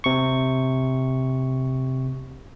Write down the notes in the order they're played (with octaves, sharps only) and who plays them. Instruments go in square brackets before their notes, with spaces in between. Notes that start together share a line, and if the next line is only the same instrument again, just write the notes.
[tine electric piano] C3 C#6